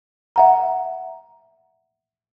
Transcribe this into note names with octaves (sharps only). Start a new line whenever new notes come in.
E5 F#5 A#5